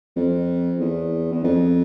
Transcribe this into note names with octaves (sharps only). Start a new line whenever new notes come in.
F2
E2
E2
F2